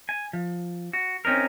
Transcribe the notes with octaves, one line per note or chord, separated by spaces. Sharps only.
G#5
F3
F#4
C4 C#4 D#4 A#4